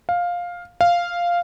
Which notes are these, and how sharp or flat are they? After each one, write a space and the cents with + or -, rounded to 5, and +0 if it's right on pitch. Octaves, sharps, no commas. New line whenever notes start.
F5 +10
F5 -5